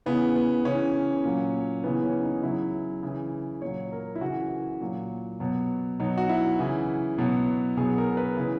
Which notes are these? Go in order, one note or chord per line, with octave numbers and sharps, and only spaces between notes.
C#3 E3 B3
B3
C#3 E3 C#4
A#2 F#3
C#3 E3 B3
C#4
D#4
C#3 F#3 E4
C#3 E3
A#2 F#3 C#5
A#4
E4
C#3 E3 F#4
A#2 F#3
B2 F#3
B2 F#3 D#4
F#4
E4
C#3 E3
B2 F#3
B2 F#3 G#4
A#4
B4
C#3 E3